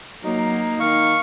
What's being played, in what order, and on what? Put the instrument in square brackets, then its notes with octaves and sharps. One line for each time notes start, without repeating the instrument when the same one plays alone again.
[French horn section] F#3 [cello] A#3 [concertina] D#4
[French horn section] D#3 D#4 [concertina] F5 C#6